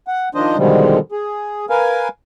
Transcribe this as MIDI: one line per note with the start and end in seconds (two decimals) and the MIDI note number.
0.07 0.29 78
0.35 0.57 51
0.35 0.57 53
0.35 0.57 62
0.35 0.57 72
0.35 0.57 75
0.58 0.99 47
0.58 0.99 50
0.58 0.99 51
0.58 0.99 53
0.58 0.99 55
0.58 0.99 56
1.12 1.66 68
1.70 2.08 70
1.70 2.08 71
1.70 2.08 77
1.70 2.08 80